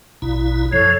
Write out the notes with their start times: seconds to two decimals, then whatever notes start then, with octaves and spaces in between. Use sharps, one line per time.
0.22 A#1 B2 E4
0.73 F#2 F3 A4 C#5 G#6